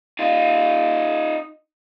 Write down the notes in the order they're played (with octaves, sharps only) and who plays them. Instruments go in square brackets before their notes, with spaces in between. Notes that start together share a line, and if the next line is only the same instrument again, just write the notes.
[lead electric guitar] D#4 F4